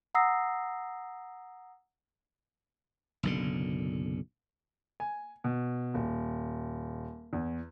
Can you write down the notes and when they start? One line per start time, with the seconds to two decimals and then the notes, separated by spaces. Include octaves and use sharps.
0.15 F#5 A#5 D#6 E6 A#6 C7
3.23 F#1 B1 D3
5.00 G#5
5.44 B2
5.94 D#1
7.33 E2